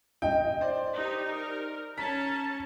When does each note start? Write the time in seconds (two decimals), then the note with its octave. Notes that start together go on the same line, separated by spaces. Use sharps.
0.22 D#5 G5
0.61 C5 D5
0.96 D#4 G4
1.32 A#4
1.97 C#4 A5 A#5 B6